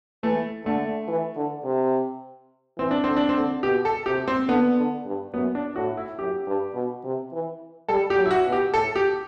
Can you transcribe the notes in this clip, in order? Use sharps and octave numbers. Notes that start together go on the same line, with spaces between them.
E3 A3
D3 A3
E3
D3
C3
E3 C4
D4
D3 C4
D4
C4
D3
B2 G4
A4
C3 G4
C4
D3 B3
D3
G2
F#2 B3
D4
A2 F#4
E4
F#2 G4
G2
B2
C3
E3
G3 A4
G4
F#3
E4
F#4
B2
G4
A2 A4
G4